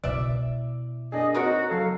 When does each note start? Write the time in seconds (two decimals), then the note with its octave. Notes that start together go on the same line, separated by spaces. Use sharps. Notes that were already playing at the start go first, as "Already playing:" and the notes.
0.04 B2 E4 D5 E5
1.12 A#3 D4 G#4 D#5
1.34 C4 D#4 F#4 A#4 C#5
1.70 F#3 A4 F5